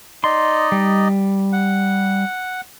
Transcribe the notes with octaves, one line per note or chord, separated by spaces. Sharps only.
D#4 D5 D#5 C6
G3
F#5